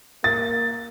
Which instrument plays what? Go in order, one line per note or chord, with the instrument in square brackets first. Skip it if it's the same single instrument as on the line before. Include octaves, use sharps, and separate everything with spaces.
[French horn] A#3 [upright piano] A6